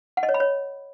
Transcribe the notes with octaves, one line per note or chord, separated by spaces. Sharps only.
F#5
D#5
C#5
B5
C#5